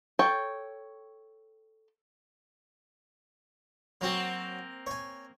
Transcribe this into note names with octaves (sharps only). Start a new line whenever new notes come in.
A4 C#5 G5
F#3 A#3 C4 F#4
C#5 G#5